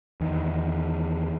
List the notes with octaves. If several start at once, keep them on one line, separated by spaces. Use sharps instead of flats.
E2 D#3